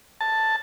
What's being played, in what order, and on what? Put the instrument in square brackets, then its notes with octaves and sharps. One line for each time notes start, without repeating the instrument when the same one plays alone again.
[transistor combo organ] A5